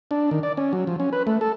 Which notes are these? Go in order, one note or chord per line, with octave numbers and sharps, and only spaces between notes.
D4
D#3
D5
C#4
F#3
F3
C#4
B4
A3
A4